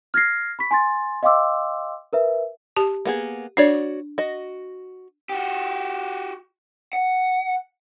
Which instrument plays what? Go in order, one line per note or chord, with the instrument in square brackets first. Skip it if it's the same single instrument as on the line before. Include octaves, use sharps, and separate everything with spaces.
[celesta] F6 G#6 A#6 C7
B5 C#6 B6
G#5 C6 A6
D#5 F5 G5 C6 D6 E6
A#4 B4 E5
[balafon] G4 A5
[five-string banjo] A#3 B3 G#4
[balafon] D4 [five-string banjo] F#4 C#5 D5
[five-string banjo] F#4 D#5
[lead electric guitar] F#4 G4
F#5